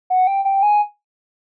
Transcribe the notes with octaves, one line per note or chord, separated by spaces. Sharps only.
F#5
G5
G5
G#5